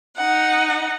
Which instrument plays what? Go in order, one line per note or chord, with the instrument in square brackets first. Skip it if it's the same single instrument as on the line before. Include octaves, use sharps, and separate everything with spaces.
[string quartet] D#4 F#5